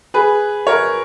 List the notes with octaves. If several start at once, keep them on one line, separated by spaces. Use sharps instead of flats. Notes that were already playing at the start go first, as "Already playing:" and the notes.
G#4 B4
A#4 C#5